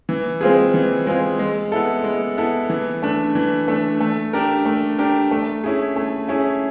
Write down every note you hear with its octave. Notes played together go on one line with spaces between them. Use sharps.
E3
G#3 C4 F4 G#4
E3
G#3 C4 F4 G#4
G#3
B3 E4 A4
G#3
B3 E4 A4
E3
A3 D4
E3
A3 D4
A3
D4 G4 A#4
A3
D4 G4 A#4
A3
C#4 E4 G#4
A3
C#4 E4 G#4